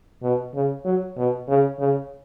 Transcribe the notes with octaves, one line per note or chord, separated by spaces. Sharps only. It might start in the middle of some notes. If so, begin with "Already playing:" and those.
B2
C#3
F#3
B2
C#3
C#3